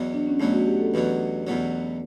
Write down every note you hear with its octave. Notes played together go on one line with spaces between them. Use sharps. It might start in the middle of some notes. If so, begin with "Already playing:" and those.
Already playing: E2 B2 F#3
D4
C#4
E2 B2 F#3 A3
F#4
G4
A4
E2 B2 F#3 B4
E2 B2 F#3